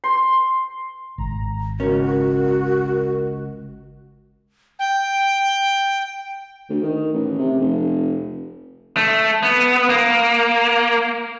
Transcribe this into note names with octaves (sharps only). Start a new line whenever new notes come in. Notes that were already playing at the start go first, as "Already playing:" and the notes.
C6
G#1 A#5
C#2 C#4 F#4 A#4
G5
D2
D#3
A1
C3
F1
A3
B3
A#3